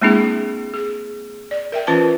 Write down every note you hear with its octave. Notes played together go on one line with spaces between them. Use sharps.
G#3 A#3 C4 D4 E4 G#4
G#4
D5
A#4 E5 G5
E3 C#4 F4 B4 E5 A5